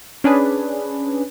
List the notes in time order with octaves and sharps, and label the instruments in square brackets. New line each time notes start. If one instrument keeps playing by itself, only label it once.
[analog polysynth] C#4 D4 G#4 B4